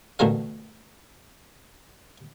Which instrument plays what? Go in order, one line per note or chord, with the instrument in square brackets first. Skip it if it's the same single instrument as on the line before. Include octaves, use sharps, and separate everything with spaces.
[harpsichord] A1 B2 D3 A3 A#4 F5